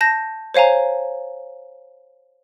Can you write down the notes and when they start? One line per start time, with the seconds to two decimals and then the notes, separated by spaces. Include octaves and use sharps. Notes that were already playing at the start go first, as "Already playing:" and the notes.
0.01 A5 G6 A#6
0.54 C5 C#5 F5 G#5 A#5